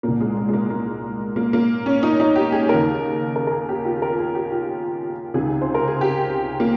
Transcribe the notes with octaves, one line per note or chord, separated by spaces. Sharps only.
C2 A#2 A#3
G#3
G#3
G#3
A#3
A#3
A#3
A#3
C#4
D#4
D#4
G4
G#4
C#3 A#4
D#2
A#4
A#4
G#4
G4
F4
A#4
G#4
G4
F4
C#2 C3 D#3 G#4
C5
A#4
G#4
G4
A#3